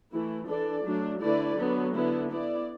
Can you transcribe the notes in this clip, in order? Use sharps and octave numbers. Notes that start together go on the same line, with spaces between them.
E3 A3 E4
E3 D4 A4 D5
F#3 A3 D4
D3 A3 E4 B4 D5
D3 F#3 B3
D3 B3 E4
B3 E4 D5